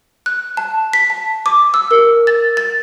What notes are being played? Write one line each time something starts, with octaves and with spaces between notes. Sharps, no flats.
F#6
A5
B6
A5
D6
E6
A#4
A6
A6